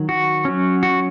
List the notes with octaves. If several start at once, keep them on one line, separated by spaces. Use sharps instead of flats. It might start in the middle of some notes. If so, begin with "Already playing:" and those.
Already playing: D#3 F#3
F#4
F#3 C#4
F#4